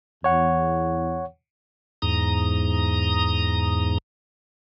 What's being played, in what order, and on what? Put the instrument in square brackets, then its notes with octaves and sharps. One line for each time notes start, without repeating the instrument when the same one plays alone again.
[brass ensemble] E2 [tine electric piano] C#5 F#5
[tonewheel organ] E2 G#2 A#5 D#6